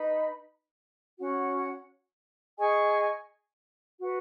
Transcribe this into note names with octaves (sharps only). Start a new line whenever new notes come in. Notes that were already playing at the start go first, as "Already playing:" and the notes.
Already playing: D#4 B4 D#5 B5
C#4 F#4 C#5 F#5
G#4 D#5 G#5 C#6
F#4 B4 F#5